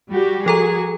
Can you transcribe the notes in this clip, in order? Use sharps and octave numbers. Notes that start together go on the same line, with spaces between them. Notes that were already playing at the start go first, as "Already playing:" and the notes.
G3 F#4 G4
F3 F#4 G#4 A4 A#5